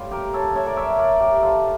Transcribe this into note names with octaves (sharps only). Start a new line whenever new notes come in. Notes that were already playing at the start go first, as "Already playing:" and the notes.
Already playing: A2 G3 F4
G4 A#4
A4 C#5
C#5 E5
A#4 D5
C#5 E5
A#4 D5
G4 A#4
F4 A4